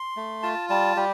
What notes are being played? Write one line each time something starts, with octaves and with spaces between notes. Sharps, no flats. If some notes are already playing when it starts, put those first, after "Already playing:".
Already playing: C6
A3
F4 A5
G3 A5
G3 G4